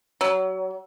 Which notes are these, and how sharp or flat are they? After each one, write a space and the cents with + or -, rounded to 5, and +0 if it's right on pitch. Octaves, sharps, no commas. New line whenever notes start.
F#3 +25